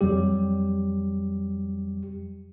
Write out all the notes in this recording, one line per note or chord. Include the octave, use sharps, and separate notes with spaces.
F2 F#3 G3 G4